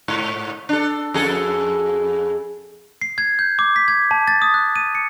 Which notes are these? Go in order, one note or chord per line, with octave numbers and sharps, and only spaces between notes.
G#2
D4 A4
F2 G#4 A4
C7
G#6
G6
D6
B6
G#6
A5
A6
D#6
F#6
D#7
C#7